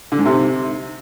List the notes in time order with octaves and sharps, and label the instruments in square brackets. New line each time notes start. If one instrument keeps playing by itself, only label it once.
[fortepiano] D3
G#2
C3